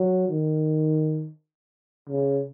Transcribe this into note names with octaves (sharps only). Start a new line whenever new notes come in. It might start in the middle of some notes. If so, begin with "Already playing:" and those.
Already playing: F#3
D#3
C#3